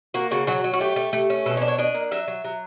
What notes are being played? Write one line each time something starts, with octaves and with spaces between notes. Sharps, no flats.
A#3 F#4
C#3 F#4
F#3 F#4
F#3
F#4
A3 G4
A3
A3
C#4
B2 A4
C#5
D4
C#5
D4 D#5
A#3
F#3 E5
F#3
F#3